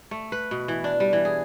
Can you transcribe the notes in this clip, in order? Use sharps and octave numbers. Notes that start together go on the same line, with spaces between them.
A3
B4
B2
E3
D4
G3
E3
G#4